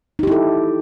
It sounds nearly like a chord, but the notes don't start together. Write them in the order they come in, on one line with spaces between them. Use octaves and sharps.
D#4 G4 E4 A4